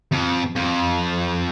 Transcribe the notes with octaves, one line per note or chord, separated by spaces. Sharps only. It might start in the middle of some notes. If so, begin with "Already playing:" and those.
F2
F2